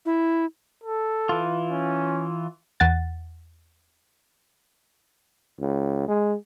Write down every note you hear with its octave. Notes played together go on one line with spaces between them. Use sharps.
E4
A4
E3 F4
C#4
E2 F#5 A6
C#2
G#3